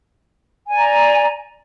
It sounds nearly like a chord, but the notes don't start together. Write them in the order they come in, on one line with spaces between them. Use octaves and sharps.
G#5 D5 A#5